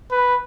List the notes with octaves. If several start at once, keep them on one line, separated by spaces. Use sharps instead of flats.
B4